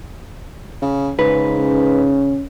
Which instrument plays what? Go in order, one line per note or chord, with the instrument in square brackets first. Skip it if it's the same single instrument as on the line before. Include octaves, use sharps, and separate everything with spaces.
[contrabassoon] C#3
[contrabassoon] G#2 [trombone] C#3 [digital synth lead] B4
[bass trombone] C#4